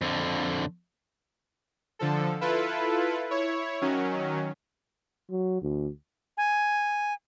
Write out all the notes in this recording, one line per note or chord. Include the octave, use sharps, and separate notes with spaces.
F2 D3
D3 F3 A4
E4 F4 A4 B4
E4 C#5
D#3 F#3 C#4
F#3
D2
G#5